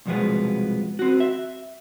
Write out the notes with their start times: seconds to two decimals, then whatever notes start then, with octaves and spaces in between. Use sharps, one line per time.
0.06 C2 F2 B2 F3 G#3 B3
0.99 C4 F#4
1.20 E5